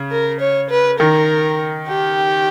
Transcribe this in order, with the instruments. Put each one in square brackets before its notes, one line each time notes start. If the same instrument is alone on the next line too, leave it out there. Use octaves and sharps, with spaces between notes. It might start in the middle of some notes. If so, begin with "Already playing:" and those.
Already playing: [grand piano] C#3
[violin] A#4
C#5
B4
[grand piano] D#3 [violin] A#4
[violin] G4